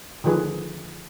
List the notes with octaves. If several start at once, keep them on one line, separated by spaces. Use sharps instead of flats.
D3 D#3 F3 G#4 B4